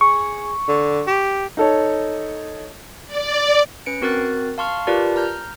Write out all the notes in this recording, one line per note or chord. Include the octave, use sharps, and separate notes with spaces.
G#4 C#6
D3
G4
D#4 A4 C#5
D5
C#4 B4 C#7 D7
C4 F#4 A#4 F#6 A6
F5 A5 C6 C#6 F6
F4 G4 A#4 B4 D5 A5
A#5 F6 G6